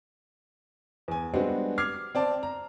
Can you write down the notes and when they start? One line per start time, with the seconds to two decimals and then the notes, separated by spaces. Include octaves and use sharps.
1.08 E2 G#5
1.34 G3 G#3 B3 C4 D4 F#4
1.78 D6 F6 G#6 C7
2.15 C4 D5 A5
2.43 A#5